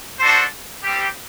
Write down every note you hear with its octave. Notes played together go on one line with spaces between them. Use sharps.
D4 F#4 A4 C5
G3 C4 G4